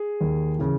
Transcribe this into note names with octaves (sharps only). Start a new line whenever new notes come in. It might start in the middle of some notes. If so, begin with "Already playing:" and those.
Already playing: G#4
D#2
C#3 E3